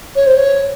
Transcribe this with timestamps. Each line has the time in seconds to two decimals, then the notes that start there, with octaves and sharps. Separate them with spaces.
0.15 C#5
0.26 C5
0.36 C#5